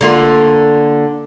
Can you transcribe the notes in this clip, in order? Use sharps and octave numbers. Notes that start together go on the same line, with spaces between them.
D3 A#3 F4